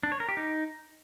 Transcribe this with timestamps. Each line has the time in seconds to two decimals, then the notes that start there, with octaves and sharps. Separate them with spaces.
0.03 D4
0.12 C#5
0.20 A#4
0.29 G4
0.37 D#4